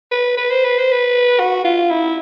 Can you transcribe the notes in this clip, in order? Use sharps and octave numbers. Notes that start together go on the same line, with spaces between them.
B4
B4
C5
B4
C5
B4
F#4
F4
E4